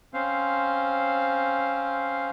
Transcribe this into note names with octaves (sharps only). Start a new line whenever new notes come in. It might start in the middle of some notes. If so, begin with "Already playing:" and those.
C4 C#4 C5 F5